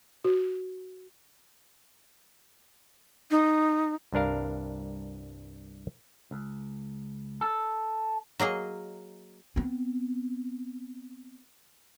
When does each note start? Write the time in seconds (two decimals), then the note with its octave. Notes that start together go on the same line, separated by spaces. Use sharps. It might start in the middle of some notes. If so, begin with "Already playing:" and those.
0.24 F#4
3.31 D#4
4.12 C2 G2 D4 A#4 F5
6.31 C#2
7.41 A4
8.39 F#3 A#3 G#4 D#5
9.56 B3 C4